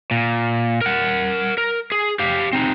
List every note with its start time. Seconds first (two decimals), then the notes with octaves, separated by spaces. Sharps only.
0.11 A#2
0.81 A#4 F#5
1.58 A#4
1.92 G#4
2.19 G4 F5
2.53 C4 D#4